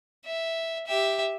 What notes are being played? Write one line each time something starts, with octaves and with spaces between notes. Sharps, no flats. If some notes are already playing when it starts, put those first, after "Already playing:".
E5
G4 E5